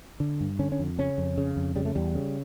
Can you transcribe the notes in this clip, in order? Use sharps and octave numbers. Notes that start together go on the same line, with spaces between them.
D3
G2
D3 C#4
C#4
F2
C#3 C#4
F2
C#3
F2
C#3 G3
A3
E2 G3
C#3